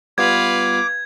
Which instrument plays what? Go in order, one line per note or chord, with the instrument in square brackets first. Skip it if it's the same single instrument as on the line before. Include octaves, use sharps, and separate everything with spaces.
[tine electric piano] G3 B3 F4 [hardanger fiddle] B4 F5 [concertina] D6 [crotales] G#6